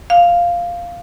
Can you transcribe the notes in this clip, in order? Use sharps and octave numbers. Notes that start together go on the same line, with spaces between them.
F5